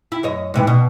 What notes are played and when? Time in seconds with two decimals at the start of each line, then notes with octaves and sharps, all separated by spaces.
0.12 E4
0.23 F#2 C#5 D#5
0.54 G#2 C3 E3
0.67 B2